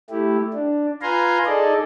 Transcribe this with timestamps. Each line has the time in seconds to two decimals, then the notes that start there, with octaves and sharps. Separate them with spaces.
0.10 A3 E4 G4
0.53 D4
1.02 F4 B4 F5 G#5 A#5 C6
1.46 D#4 G#4 A4 D5 D#5